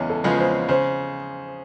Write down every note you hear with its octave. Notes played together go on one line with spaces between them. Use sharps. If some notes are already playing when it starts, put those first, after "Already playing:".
Already playing: E2 C#3 G#3 C#5
A4
C#3 F3 G#3 B3
C5
C#3 C5